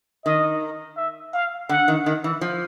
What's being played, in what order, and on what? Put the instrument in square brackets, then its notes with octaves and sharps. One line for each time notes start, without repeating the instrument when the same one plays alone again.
[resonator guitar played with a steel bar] D#3 [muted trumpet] D#5
[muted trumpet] E5
F5
[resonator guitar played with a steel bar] D3 [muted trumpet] F#5
[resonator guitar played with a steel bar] D#3
D#3
E3
F3